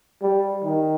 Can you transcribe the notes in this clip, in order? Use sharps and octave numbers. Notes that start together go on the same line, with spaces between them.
G3
D#3